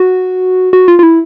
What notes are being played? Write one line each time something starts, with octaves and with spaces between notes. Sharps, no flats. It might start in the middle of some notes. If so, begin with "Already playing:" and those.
Already playing: F#4
F#4
F4
F4
E4